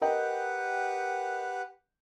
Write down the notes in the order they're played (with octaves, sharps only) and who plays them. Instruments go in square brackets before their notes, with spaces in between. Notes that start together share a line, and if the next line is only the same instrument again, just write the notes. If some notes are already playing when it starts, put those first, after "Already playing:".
[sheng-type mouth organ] G4 B4 F#5 [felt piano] A#4 D#5 G5